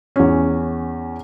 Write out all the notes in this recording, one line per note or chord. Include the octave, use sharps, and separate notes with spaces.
E2 C#4